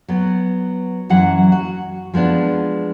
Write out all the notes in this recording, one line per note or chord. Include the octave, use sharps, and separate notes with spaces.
F#3 B3
F#2 E3 F#3 F#5
F#4
F3 G#3 B3 D4